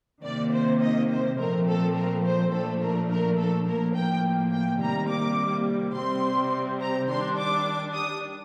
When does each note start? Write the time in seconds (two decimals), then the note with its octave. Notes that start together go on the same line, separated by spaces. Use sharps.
0.24 C3 D#3 A#3 D5
0.53 C5
0.82 D#5
1.10 C5
1.39 A#2 F3 A3 C4 A#4
1.67 A4
1.96 A#4
2.24 C5
2.53 A#2 F3 A3 D4 A4
2.81 A#4
3.10 A#4
3.38 A4
3.67 A2 F3 A#3 A#4
3.95 G5
4.52 G5
4.81 C3 D#3 G3 A#3 A#5
5.10 D6
5.95 C3 G3 C4 C6
6.80 A#5
7.08 D#3 G3 D4 C6
7.37 D6
7.94 D#6